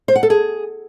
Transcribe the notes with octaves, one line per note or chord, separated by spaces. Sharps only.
C5
F#5
A4
G#4